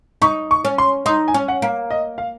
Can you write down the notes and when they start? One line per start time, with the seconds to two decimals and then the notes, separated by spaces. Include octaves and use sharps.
0.22 D#4 C#6
0.51 C#6
0.65 C#4
0.78 C6
1.06 D#4 C6
1.28 G#5
1.34 C#4
1.48 F#5
1.62 A#3
1.90 D#5
2.18 F5